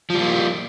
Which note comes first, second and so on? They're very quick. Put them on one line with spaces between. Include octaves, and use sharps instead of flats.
F3 G3 A#3